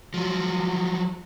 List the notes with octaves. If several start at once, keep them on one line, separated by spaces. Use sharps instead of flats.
F3 F#3